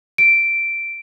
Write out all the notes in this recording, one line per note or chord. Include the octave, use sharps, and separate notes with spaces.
D7